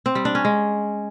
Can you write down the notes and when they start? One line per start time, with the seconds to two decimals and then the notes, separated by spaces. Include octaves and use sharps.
0.06 C4
0.15 G3
0.25 D4
0.35 C#4
0.45 G#3